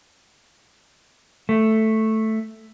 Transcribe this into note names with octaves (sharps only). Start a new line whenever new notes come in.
A3